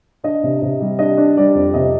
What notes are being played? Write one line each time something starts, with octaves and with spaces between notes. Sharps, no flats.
D4 D#5
C3
C3
G3
D4 D#5
D4
G3 D5
F2
C3 D#5